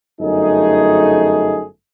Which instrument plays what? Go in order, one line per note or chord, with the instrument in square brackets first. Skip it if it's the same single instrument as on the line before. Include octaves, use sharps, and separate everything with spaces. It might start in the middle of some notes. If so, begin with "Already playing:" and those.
[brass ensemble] G1 F#2 A3 D#4 G#4